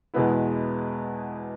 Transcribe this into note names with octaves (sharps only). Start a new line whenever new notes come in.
E2 B2 G#3 B3 E4